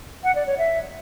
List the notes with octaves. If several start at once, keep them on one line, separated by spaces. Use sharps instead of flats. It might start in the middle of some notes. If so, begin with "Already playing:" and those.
F#5
D5
C#5
E5